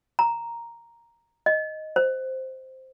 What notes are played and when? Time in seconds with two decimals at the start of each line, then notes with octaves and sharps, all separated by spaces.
0.19 A#5
1.46 D#5
1.96 C5